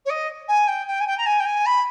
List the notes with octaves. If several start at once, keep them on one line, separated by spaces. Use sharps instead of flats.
C#5
D#5
G#5
G5
G5
G#5
G5
A#5
G#5
G5
G#5
B5